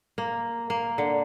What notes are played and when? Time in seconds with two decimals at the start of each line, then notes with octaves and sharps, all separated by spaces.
0.18 A#3
0.70 A#3
0.98 D3